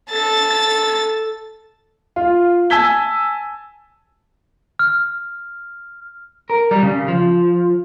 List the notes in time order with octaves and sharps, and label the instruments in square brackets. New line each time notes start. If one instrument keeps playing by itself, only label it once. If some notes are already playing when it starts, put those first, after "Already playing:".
[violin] A4 A6
[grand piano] F4
G#5 A5 E6 G#6 B6 G7
[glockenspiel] F6
[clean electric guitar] A#4
G3
C#3
F3